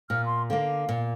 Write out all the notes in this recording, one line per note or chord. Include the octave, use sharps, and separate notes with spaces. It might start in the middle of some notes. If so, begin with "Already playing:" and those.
A#2 F6
C6
D3 A#3 F5
A#2